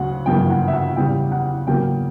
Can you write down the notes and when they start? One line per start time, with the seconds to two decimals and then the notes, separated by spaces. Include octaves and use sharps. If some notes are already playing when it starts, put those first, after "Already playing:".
Already playing: D2 C#3 F#3 F#5
0.26 G1 F#2 C#3 E3 A#3 G5
0.50 F#5
0.68 E5
0.73 F#5
0.96 E2 C#3 G3 B3 G5
1.32 F#5
1.67 E2 C#3 F#3 A#3 G5